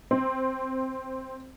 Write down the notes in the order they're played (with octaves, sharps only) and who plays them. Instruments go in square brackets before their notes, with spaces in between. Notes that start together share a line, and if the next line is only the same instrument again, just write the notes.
[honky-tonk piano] C4